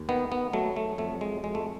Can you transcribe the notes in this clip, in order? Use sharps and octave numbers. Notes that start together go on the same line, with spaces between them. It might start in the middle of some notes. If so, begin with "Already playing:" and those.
Already playing: D#2
D#3 B3
B3
F#3 A3
A3
F2 A3
G#3
F2 G#3
A3